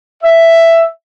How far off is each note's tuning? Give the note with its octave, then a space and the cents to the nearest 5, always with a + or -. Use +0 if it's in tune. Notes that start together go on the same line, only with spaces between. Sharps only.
E5 +5